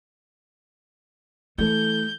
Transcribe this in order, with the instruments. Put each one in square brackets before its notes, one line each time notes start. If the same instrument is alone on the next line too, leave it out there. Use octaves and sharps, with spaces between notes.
[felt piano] E3 A4 [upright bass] A3 [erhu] G6